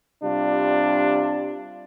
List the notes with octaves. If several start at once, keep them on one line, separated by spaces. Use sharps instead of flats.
C3 G3 D4 F4